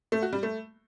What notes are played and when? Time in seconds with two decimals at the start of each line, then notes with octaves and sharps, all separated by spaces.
0.12 A3
0.22 F#4
0.33 G3
0.43 A3